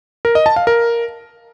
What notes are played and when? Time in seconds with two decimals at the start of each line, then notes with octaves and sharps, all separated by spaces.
0.25 A#4
0.35 D#5
0.46 A5
0.56 F5
0.67 A#4